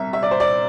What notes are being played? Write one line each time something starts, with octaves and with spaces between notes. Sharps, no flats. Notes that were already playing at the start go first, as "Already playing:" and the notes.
Already playing: C2 E5
E5
D5
C5
D5